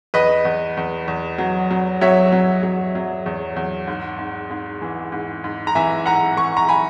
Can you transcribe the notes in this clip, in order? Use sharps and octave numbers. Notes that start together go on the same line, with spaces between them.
E2 B4 D#5
E2
E2
E2
F#3
F#3
F#3 C#5 E5
F#3
F#3
F#3
E2
E2
G#2
G#2
G#2
E3
G#2
G#2
A#5
E3 E5 G#5
G#2 F#5 A#5
E3 C#6
A#5 C#6
G#5 B5